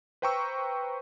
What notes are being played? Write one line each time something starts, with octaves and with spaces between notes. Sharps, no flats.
B4 C5 G5 A#5 C#6 E6